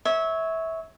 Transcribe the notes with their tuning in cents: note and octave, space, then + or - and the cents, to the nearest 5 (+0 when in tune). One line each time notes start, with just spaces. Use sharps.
C#5 +0 E5 -20